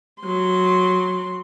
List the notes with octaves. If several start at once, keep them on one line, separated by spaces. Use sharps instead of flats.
F#3 C6